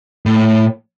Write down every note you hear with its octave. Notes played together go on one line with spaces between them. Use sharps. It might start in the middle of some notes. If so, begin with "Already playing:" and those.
A2